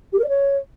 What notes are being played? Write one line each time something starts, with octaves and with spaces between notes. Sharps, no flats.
G4
A#4
D5
C#5